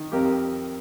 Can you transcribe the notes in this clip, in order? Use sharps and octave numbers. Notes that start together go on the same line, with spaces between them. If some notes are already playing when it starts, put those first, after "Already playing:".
Already playing: D#3
F2 G4 A#4